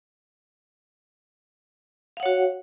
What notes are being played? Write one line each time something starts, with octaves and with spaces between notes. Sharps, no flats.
F#4 C#5 F5 F#5